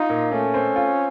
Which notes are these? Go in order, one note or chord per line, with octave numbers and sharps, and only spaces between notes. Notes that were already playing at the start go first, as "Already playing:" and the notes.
Already playing: D#4 F4
A#2
A3 C#4
C4
F4